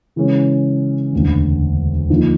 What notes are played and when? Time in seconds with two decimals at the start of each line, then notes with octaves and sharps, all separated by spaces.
0.16 C#3 E3 G#3 C#4
1.12 E1 D2 D3
2.10 D3 F3 A#3 D#4